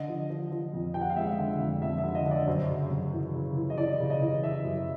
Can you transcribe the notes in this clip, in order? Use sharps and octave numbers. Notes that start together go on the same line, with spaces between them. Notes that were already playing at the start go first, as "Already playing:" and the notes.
Already playing: D3 D#5
F3
F3
F3
F2
F3 G5
F#5
F5
G#3 E5
D3
F2
F2 E5
E5
D3
D#5
D3
D5
F#2 C5
C#3
F#2
E3
C#3
E3
D#5
E3 D5
C#3
D#5
E3
E3 E5
F#2